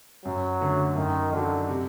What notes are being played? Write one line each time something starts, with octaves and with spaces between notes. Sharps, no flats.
F#2 F#3
D3 A3
F#2 D#3
D3 D#3 F#3
C3